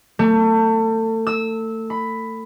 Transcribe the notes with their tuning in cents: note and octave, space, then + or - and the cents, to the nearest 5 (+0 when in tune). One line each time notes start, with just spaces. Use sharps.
A3 +30
E6 -15
B5 +10